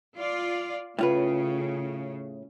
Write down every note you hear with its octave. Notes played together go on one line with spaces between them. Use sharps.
F4 D5
A2 C#3 F4 B4